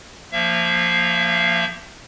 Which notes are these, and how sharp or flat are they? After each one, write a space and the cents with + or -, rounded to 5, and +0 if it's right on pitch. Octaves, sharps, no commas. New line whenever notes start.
F3 +0 A#3 +0 E5 +35